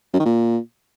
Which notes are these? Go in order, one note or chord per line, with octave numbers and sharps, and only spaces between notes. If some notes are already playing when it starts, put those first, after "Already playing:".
F#2
D#3
A#2